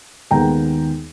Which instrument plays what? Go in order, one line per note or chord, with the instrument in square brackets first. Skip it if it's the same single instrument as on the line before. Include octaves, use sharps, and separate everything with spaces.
[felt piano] D#2 D#3 G#3 B3 G5 A#5